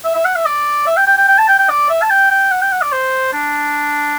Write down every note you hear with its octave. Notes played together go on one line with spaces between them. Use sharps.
E5
E5
F#5
E5
D5
E5
G5
G5
G5
G5
A5
G5
G5
D5
E5
A5
G5
G5
F#5
G5
F#5
D5
C5
D4